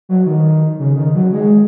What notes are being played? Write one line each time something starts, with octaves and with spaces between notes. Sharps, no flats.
F#3
D#3
C#3
D#3
F#3
G#3